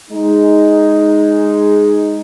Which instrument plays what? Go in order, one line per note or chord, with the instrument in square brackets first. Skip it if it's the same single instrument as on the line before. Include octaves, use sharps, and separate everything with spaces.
[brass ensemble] G#3 D#4